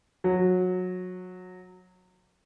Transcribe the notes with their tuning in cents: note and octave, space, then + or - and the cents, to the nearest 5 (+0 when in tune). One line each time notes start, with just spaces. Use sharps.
F#3 -20